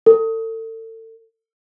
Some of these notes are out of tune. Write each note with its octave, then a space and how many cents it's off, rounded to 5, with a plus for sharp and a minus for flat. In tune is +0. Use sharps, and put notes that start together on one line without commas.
A4 +35